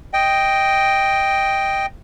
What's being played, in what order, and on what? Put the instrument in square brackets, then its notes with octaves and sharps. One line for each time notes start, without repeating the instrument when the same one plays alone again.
[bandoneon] D#5 G5